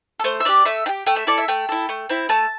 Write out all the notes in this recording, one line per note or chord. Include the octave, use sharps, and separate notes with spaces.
A4
A3 C5
E5
D4 G4 D5
A3 E5
D4 G4 G5
A3 G5
E5
E4 A4 D5
E5
A3 G5
E4 A4
A3
C4 E4
A3 A5